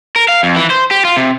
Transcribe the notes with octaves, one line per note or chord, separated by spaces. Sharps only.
A#4
F5
F2
E3
C5
G4
F4
C3